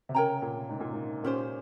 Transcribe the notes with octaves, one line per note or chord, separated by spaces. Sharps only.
C3
C#3 A#4 C#5 G5 A#5
A#2
G#2
A#2
G#2
A#2 C#4 G4 C5